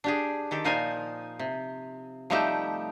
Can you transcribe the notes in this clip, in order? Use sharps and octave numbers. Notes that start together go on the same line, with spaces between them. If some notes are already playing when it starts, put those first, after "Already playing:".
D4 G4 G#4
D#3 G4 A4
A#2 F3 D#4 F4 C5 G#5
C3
F3 G3 A3 D#4 G4 E5